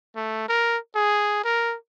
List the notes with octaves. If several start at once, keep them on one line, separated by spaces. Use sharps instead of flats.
A3
A#4
G#4
A#4